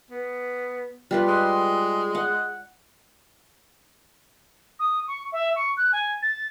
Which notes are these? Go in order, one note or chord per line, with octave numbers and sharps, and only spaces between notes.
B3
G3 F4 B4
G#3
F#5
D#6
C#6
E5
C#6
F#6
G#5
A6